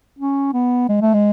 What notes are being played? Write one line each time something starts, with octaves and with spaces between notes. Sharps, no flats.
C#4
B3
G#3
A3
G#3